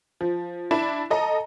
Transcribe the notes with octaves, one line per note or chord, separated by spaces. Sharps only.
F3
D4 E4 E7
A4 D#5 A#5